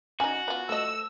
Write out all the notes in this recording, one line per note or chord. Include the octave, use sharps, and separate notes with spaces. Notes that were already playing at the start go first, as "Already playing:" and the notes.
C#4 D#4 F#4 G#5
B3 F4
F3 A3 D#5 E6